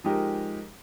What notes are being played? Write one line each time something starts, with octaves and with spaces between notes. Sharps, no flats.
F3 G#3 D#4 G4 A#4